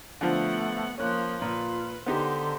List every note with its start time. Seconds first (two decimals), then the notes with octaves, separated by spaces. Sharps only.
0.21 D3 F3 A3 B3 F#5
0.98 F3 A#3 C#4 F#6
1.42 A#2 F4 B4
2.06 D3 B3 D#4 G4 C5